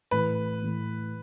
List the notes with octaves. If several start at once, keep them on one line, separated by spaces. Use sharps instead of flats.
A2 E3 A3 B4
A2 E3 A3